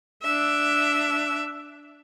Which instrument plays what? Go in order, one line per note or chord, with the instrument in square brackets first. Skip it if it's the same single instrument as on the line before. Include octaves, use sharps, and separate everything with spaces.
[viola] D4 E5